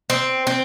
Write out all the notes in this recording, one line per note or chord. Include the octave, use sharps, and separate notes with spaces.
C4
C4